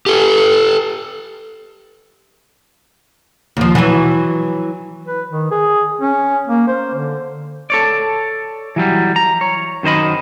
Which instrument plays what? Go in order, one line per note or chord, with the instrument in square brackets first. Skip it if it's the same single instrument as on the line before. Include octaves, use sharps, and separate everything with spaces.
[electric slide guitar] G4 A4
[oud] D#2 F3
E3 F#3
[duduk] B4
D#3
G#4
C#4
A#3
C5
D3
[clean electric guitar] A4 C#5 D5
E3 F#3 G3
A#5
C#5
F#2 D#3 C5 D#5 B5